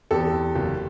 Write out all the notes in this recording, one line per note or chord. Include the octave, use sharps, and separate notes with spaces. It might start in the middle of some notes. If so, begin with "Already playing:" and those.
E2 G4 A4
E2
F#1